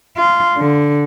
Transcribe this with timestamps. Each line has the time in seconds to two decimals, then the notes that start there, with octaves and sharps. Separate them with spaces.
0.17 F4
0.57 D3